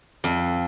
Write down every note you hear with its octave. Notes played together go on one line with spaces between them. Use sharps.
F2